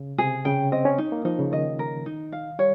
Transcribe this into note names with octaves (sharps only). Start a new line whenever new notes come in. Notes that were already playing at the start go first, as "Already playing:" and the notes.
Already playing: C#3
C3 G#4
C#3 G5
C4 D#5
C#4
D#4
A#3
F3 D#4
C#3
D#3 D#5
A#4
D#4
F5
G3 C#5